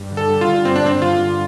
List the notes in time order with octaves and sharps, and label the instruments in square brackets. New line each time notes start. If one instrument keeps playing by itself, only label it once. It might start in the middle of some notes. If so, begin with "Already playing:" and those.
Already playing: [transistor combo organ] G2
D3
[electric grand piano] A4
[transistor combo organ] G3
[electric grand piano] F4
[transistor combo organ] D3
[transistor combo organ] G2 [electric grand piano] C4
[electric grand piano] D4
[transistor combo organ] G2 [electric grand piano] C4
[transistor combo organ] D3 [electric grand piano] F4
[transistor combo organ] G2